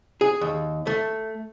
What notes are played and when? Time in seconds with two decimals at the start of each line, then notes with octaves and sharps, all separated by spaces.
0.21 G#4
0.41 D#2
0.87 A3